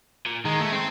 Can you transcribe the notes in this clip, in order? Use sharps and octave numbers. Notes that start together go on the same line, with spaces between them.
A#2
D#3 G#3
A3
C4